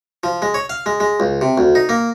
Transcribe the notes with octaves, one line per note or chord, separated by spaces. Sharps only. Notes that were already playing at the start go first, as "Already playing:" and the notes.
F3
G#3
C#5
F5
G#3
G#3
C#2
C3
D2
D#4
A#3